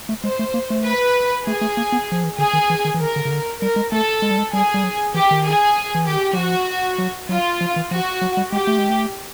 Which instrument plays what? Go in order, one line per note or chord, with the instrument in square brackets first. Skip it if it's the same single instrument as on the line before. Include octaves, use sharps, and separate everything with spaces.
[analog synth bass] A3
[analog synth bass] G#3 [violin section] C5
[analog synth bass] A3
A#3
A3
[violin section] B4
[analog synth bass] A3 [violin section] G#4
[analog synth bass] A3
A#3
B3
F3
E3
[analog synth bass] D3 [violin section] G#4
[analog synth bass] D#3
E3
D#3
E3
[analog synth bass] D#3 [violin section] A#4
[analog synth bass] D3
C#3
D3
[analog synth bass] G3 [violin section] A#4
[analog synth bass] G#3
[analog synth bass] A3 [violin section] A4
[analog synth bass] G#3
G3
G#3
[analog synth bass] G3 [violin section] G#4
[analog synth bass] G3
F#3
[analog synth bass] E3 [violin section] G4
[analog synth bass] D#3
[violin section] G#4
[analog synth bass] E3
[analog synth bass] D#3 [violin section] G4
[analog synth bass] F#3
[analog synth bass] F3 [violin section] F#4
[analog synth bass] F#3
[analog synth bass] F#3 [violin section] F4
[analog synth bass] F3
E3
[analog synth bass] F3 [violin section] F#4
[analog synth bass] F#3
G3
[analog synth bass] G#3 [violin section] G4
[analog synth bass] A3
G#3
A3